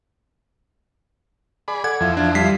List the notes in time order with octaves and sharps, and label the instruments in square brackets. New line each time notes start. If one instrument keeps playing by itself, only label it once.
[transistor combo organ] G#4 D5 B5
[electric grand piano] A4 F#5 G#6 [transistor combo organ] D5
[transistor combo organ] F2 F3 E4
[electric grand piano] D4
G3 B6 C7